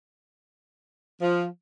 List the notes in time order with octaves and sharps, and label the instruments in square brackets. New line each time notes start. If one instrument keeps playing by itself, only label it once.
[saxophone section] F3